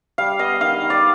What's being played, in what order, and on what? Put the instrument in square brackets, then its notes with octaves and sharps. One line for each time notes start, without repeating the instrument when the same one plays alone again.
[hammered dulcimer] G3 F5
B3 D#5
D#3 F5
D#3
D5